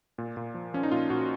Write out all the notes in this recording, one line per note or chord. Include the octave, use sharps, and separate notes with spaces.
A#2
A#2
F3
F3 C#4
D#4
A#2 F4
A#2 F#4